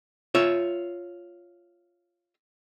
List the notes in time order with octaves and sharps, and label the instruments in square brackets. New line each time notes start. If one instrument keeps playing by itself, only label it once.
[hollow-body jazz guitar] F4 C#5 E5